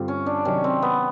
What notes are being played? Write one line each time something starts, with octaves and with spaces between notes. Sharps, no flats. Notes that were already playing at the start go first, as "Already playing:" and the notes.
Already playing: G2 D3 G3 C4 F4
C#4
D4
C3 D#3 F#3 C#4
C4
B3